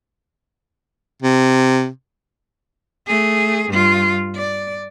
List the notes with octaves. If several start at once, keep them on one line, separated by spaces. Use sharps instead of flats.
C3
A3 G#4
G2 F4
D5